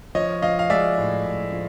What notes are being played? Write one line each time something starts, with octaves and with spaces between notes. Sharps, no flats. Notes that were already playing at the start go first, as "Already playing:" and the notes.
F3 C#5 D#5
F3 D#5 F5
F5
G#3 D5 E5
A2
A2
F3